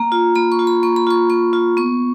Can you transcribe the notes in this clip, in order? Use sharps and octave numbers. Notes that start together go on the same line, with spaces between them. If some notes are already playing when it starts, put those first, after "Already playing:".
Already playing: A#3 A#5
F4
A#3 B5
C#6
F4
B5
A#3 C#6
B5
F4 C#6
A#3 C#6
F4
B3 C#6